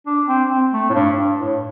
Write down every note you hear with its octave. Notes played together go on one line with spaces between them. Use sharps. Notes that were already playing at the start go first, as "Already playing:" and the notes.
D4
C4
C4
A3
A2
G2
G2
A2